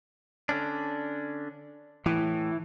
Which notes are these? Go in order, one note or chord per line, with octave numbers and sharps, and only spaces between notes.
D3 C#4 D4
A2 E3